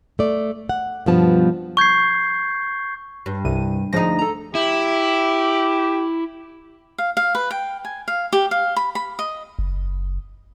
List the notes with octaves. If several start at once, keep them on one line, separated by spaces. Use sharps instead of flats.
A3 D5
F#5
G2 B2 F3 B3 A5
C#6 G6 G#6 C7
G2
C2 C3 D#7
D2 F3 G#3 D#4 A#6
A4 A#5
E4 G4
F5
F5
B4
G5
G#5
F5
G4
F5
B5
B5
D#5
F#1